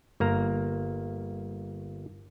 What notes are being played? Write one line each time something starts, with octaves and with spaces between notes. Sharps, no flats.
G1 A#3 A#5